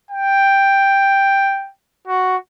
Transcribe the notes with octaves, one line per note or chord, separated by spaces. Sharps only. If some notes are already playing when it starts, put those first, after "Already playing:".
G5
F#4